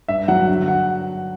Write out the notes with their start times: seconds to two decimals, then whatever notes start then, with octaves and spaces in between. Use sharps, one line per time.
0.08 G2 E5
0.28 F#3 F#5
0.49 D3
0.68 F#5